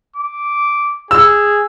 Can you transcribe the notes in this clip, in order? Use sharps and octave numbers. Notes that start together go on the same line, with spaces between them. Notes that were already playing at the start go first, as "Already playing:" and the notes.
D6
G#4 E6